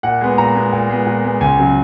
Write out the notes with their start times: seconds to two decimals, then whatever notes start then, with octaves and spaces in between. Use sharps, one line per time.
0.03 A#2 F#5
0.21 G#3 B3
0.38 A#2 A#5
0.55 G#3 B3
0.73 A#2
0.89 G#3 B3
1.07 A#2
1.24 G#3 B3
1.41 C#2 G#5
1.58 C#3 F#3